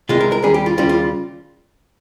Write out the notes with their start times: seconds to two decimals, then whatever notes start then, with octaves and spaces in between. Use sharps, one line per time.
0.09 C2 C3 D#3 G#3 F4
0.21 A#4
0.32 A#4
0.42 D#2 C#3 G3 G#4
0.54 G4
0.66 F4
0.78 D#2 C#3 G3 F4
0.89 F4